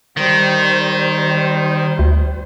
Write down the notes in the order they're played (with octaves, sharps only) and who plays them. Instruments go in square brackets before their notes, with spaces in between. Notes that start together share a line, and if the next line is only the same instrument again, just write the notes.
[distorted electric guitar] D#3 [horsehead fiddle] G3 C5
[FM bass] D2